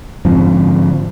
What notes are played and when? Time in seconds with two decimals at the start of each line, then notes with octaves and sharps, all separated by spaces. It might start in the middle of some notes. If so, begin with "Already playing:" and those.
0.25 G#2 D3 F3 C4